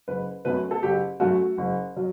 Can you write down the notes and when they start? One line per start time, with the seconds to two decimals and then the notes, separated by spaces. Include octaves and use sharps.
0.08 F#1 B4
0.45 F#2 F#3 A3 B4
0.71 A4
0.83 F#1 G4
1.20 F#2 F#3 A3 F#4
1.58 F#1
1.96 F#3